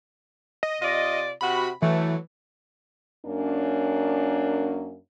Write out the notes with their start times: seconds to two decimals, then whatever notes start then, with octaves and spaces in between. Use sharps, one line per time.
0.63 D#5
0.82 C3 F4 D5 D#5
1.41 C3 F#4 B5
1.82 E3 F#3 A3
3.25 F#2 A#3 C#4 D4